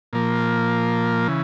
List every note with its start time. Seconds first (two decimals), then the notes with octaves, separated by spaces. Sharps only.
0.13 A#2 F3 A#3
1.28 C#3 E3